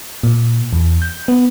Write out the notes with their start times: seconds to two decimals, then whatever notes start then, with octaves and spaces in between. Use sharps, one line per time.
0.23 A#2
0.73 E2
1.02 G6
1.28 B3